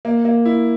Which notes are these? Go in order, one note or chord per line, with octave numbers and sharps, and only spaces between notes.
A#3
A#3
E4